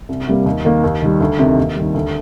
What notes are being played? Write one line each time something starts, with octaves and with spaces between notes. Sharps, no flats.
C2
C3 G3 A#3
D#2
D#3 A#3
D#2
D#3 G3
D2
C3 D#3
D#2
D#3 G3
D2